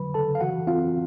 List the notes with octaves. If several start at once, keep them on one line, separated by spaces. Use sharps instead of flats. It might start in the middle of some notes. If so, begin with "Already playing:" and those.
Already playing: D3 F#3 B4 B5
C#3 A4 A5
F5
E3 F#4 F#5
C4 F4 F5